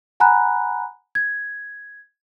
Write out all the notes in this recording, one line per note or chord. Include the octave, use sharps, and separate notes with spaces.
F#5 G#5 A#5 B5 F#6
G#6